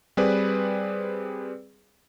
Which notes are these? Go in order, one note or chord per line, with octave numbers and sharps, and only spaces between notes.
G3 C4 G#4 B4 D5